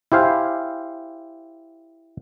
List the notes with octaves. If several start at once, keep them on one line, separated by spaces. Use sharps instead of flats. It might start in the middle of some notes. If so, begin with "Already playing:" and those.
E4 G4 C5 F5 G#5